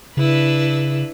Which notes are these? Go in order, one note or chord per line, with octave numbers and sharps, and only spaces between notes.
C#3 D4 E4 B4